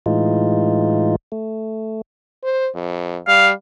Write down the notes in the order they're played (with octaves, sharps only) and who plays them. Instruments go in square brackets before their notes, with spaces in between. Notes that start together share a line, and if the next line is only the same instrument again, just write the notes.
[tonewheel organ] A2 E3 G#3 D#4 F4
A3
[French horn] C5
F2
[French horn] G3 [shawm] F5